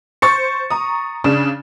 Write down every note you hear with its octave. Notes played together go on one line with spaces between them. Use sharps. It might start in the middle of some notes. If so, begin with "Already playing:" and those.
C5 C#6 A6 C#7
A#5 D#6
C#3 D4